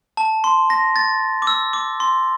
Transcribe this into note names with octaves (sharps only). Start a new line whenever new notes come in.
A5
C6
A#6
A6
D6
E6
D6
C6